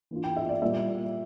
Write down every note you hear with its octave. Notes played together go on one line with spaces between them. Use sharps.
E3 A#3 D4 F4
G5
E5
D5
A#2 G3 A#3 E5